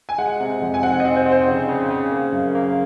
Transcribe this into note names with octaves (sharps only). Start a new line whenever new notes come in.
G#5
G#3 F#5
C3
F2
G#5
C4 F#5
C4 D#5
C5
C4
C5
C#3
C#3
C#3
A#3
F#2
A#3